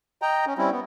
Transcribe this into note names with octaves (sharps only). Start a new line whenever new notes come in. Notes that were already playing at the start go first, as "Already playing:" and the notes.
D#5 G5 A#5
C#4
G3 C4 C#4 E4
B3